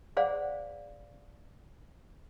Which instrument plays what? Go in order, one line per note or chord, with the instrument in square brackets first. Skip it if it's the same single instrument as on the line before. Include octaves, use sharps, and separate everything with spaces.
[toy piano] G#4 C5 D5 F5 F#5